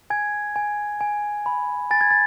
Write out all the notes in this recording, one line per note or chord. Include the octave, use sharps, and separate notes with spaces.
G#5 G#6
G#5
G#5
B5
G#5 A6
G#6
A6